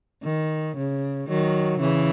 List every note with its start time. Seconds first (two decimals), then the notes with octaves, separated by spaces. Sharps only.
0.23 D#3
0.77 C#3
1.28 D#3 F#3
1.80 C#3 E3